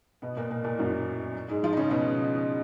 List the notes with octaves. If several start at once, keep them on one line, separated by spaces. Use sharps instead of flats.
B2 B3
A#2 A#3
A#2 A#3
A#2 A#3
F#2 F#3
G#2 G#3
F3 F4
D#4
C#3 C#4
B2 B3